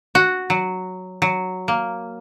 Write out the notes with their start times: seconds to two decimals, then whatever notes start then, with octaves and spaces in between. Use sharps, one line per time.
0.15 F#4
0.50 F#3
1.22 F#3
1.68 A#3